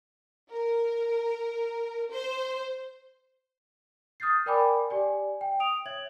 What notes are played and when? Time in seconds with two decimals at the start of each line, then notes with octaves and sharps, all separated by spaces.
0.50 A#4
2.11 C5
4.20 D#6 F6 G6 A6 C7
4.46 A#4 D5 G5 G#5 B5 D6
4.90 G4 D5 G#5
5.41 G5
5.60 D#6 D7 F7
5.86 C#5 E5 G#6 F#7